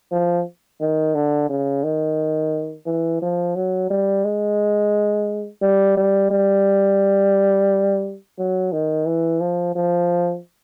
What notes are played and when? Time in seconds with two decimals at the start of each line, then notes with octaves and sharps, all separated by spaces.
0.12 F3
0.81 D#3
1.15 D3
1.49 C#3
1.84 D#3
2.86 E3
3.22 F3
3.55 F#3
3.90 G3
4.24 G#3
5.62 G3
5.97 G3
6.31 G3
8.38 F#3
8.72 D#3
9.07 E3
9.41 F3
9.75 F3